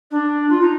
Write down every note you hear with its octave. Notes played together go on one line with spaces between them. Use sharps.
D4
F4
D#4